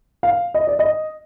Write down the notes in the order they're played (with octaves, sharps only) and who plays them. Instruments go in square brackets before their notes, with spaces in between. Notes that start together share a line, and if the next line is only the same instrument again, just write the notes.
[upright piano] F5
D#5
D5
D#5